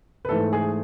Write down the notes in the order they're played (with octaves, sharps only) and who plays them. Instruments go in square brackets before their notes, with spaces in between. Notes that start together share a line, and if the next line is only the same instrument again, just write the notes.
[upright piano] B4
G#2 E3 A3 A4
G#4